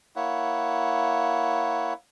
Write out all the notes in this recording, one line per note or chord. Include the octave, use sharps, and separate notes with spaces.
A#3 E4 C#5 F#5